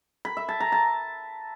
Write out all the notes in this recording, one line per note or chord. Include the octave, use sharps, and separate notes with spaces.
B5
E5
A5
A#5
A5